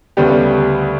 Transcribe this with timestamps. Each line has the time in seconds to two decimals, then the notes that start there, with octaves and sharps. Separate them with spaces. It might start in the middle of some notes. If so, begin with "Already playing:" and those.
0.17 D2 C#3 G3 B3 G4